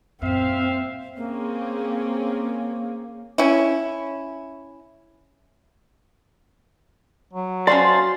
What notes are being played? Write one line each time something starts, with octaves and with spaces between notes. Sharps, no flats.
F#2 A#2 C4 E5 F5
A#3 C4 C#4 G#4
C#4 E4
F#3
C#4 F#4 C5 D5 F5 A5 C6